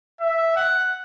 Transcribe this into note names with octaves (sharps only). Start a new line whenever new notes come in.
E5
F#5